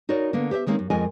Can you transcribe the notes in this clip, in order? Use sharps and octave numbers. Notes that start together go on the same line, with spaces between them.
D#4 F#4 A#4 C#5 D5
D3 A#3 B3
G4 C5 D5 E5
D#3 G#3 A#3 C4 C#4
F#2
F2 G#3 F4 A#4 D#5 G#5